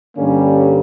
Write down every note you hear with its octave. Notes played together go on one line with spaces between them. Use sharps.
G2 D3 G3 A#3 C#4